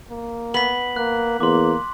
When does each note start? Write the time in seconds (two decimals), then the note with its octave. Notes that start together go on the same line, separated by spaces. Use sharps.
0.10 A#3
0.54 B3 B6 F#7
0.96 A#3 F#6
1.40 E2 A#3 C6 D6